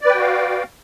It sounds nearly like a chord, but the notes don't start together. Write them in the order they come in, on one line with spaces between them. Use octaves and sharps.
D5 B4 G5 F#4 F5